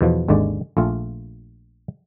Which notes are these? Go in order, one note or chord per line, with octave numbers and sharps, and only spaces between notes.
E2 B2 F3
G#1 D#2 D3 G#3 D5
A#1 A3 F4